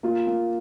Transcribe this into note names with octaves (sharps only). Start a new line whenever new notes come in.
A#3 F4
A#3